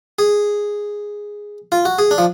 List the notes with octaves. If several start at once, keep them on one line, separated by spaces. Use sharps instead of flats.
G#4
F4
F#4
G#4
D4
F3